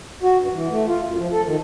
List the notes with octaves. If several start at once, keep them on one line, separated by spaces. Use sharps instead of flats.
F#4
G2
E3
A3
F4
F#2
F3
A4
D#3